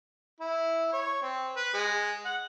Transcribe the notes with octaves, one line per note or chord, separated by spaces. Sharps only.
E4
C#5
C4
B4
G#3
F#5